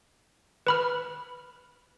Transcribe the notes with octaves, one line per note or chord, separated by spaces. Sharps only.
B4 B5 F6